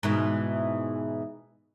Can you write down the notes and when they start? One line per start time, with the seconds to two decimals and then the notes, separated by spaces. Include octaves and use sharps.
0.03 G#2 B2 E3